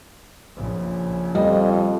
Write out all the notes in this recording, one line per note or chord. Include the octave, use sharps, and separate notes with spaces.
A#1 C#3
F2 G3 D#5